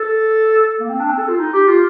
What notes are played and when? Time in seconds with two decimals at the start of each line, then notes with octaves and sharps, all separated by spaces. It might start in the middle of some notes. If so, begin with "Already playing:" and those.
Already playing: A4
0.80 A#3
0.90 C4
1.00 D4
1.09 C4
1.18 A4
1.29 F4
1.39 D#4
1.54 G4
1.68 F4